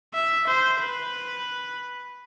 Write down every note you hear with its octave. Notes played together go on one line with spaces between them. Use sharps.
E5
C5
B4